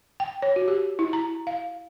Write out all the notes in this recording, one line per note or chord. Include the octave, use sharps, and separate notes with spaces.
G5
C#5
F#4
G4
E4
A#5
F5